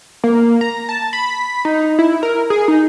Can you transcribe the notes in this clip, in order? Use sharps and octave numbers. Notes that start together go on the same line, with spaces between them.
A#3
A#5
A5
B5
D#4
E4
A#4
G#4
D#4